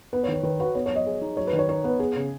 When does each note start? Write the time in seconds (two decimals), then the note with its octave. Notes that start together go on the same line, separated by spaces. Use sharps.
0.13 B3 B4
0.23 C#5
0.28 D#3
0.34 C#5
0.43 D#3 B4
0.60 F#4 B4
0.75 B3 C#5
0.86 C#5
0.91 F#3 D#5
1.07 G#4
1.22 D#4
1.37 F#3 C#5
1.47 B4
1.53 D#3
1.59 C#5
1.69 D#4 C#5
1.84 B3 B4
1.99 B3 G#4
2.16 C#3